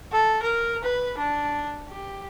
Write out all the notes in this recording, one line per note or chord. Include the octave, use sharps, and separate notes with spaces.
A4
A#4
B4
D4
G4